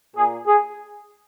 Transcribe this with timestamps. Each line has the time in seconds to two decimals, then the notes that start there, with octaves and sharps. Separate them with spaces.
0.16 A#2 A#3 G#4
0.46 G#4